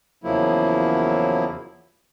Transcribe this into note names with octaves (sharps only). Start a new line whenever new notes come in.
E2 C#3 F3 F#3 A#3 E4